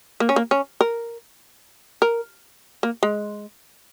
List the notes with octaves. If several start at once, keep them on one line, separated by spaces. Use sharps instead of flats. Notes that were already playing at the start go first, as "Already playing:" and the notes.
A#3
C#4
A#3
C#4
A#4
A#4
A#3
G#3